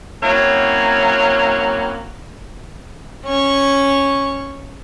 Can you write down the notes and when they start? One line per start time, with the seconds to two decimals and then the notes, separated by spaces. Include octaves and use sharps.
0.23 F#3 A#3 C4 C#4 E4 C#5
3.26 C#4 C#6